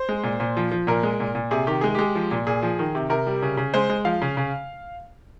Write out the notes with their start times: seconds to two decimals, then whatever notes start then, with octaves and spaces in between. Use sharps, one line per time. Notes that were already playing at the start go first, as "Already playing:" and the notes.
Already playing: C5
0.09 G#3
0.24 A#2
0.40 A#2
0.57 F3
0.71 F3
0.87 A#2 A#4
1.03 G#3
1.20 A#2
1.35 A#2
1.51 C3 G#4
1.67 D#3 G4
1.81 G#3 G#4
1.95 G#3 G4
2.15 F3
2.31 A#2
2.47 A#2 G#4
2.62 F3
2.79 D#3
2.95 C3
3.10 C3 A#4
3.27 G3
3.42 C#3
3.57 C#3
3.74 G#3 C5
3.90 G#3
4.05 F3 F5
4.22 C#3
4.37 C#3